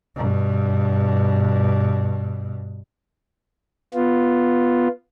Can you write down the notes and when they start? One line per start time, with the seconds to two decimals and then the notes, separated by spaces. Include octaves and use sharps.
0.16 G2 B2
3.94 B3 F4